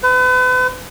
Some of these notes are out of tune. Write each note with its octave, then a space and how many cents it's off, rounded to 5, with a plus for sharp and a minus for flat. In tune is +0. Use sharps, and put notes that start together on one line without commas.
B4 +40